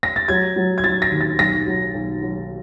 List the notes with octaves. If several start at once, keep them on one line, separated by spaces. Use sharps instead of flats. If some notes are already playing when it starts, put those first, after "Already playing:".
A#6
A6
F#3 G#6
F#3
G#6
F#3 A6
A#6
D#2
A6
B1 A#6
F#3
B1
F#3